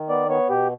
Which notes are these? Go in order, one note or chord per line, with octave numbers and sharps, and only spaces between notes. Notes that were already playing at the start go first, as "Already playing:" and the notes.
Already playing: D#3
B3 D5
B3 C#5
B2 G4